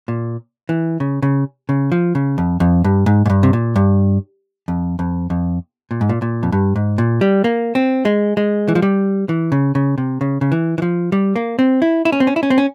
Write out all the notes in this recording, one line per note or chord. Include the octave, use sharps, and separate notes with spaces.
A#2
E3
C#3
C#3
C#3
F3
C#3
F2
F2
G2
G#2
G#2
G2
C3
A#2
G2
F2
F2
F2
A#2
G#2
A#2
A#2
F2
G2
G#2
A#2
G3
A#3
C4
G#3
G#3
E3
F3
G3
E3
C#3
C#3
C3
C#3
C#3
E3
E3
F3
G3
A#3
C4
E4
E4
C#4
C4
C#4
E4
C#4
C4
C#4